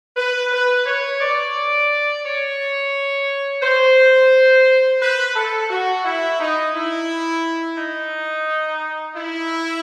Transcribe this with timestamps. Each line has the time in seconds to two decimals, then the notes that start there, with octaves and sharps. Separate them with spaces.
0.16 B4
0.51 B4
0.86 C#5
1.20 D5
2.24 C#5
3.62 C5
5.01 B4
5.35 A4
5.70 F#4
6.04 E4
6.39 D#4
6.74 E4
7.77 D#4
9.16 E4